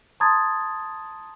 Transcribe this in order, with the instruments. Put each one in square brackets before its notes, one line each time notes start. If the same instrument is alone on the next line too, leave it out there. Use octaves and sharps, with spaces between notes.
[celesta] A5 A#5 C6 D#6 G#6 A6